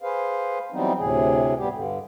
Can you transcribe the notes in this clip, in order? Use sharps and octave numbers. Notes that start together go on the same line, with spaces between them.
G#4 B4 C5 F5
E3 F#3 G3 B3 C4 D#4
D2 A2 C3 G#4
G3 B3 G4
G2 D3